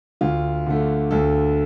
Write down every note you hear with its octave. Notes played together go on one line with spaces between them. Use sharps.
D2 F4
D3 A3
D2 A4